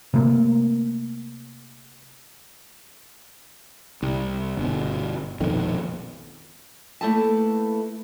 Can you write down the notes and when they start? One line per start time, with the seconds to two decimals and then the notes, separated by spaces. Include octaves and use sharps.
0.14 C3 A3 A#3
4.03 C2
4.57 G1 B2
5.40 A#1 F2 B2 D#3
7.01 A3 A#3 E4 A4 B4 A5